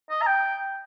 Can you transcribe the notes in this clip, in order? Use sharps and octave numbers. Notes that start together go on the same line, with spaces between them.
D#5
A#5
G5